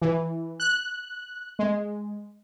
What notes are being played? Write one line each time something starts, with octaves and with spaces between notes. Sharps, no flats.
E3
F#6
G#3